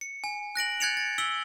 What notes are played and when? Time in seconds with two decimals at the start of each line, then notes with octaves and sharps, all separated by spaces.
0.01 C#7
0.24 G#5
0.55 F#6 A#6 D7 F#7
0.80 F#6 G#6 A6 C#7 D7 F7
0.97 A6
1.18 E6 B6 D7 F#7 G7